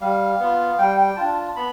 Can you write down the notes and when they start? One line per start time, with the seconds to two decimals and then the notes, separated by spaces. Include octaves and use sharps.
0.01 G3 F5
0.40 B3 F4
0.79 G3 G5
0.97 G5
1.16 D4 F4 A5
1.36 A5
1.56 B3 B5